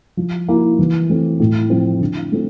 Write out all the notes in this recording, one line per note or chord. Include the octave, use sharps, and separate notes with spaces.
F3
A#3 E4
E3
A3 C4
A2
F3 C4
D3
A3 C4